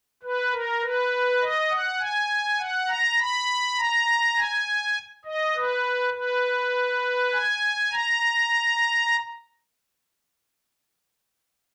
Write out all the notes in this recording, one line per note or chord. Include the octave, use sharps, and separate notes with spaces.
B4
A#4
B4
D#5
F#5
G#5
F#5
A#5
B5
A#5
G#5
D#5
B4
B4
G#5
A#5